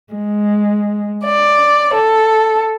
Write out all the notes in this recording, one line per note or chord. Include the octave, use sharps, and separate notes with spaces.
G#3
D5
A4